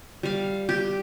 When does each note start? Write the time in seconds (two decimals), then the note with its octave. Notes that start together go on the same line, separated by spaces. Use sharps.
0.23 G3 F5
0.69 G4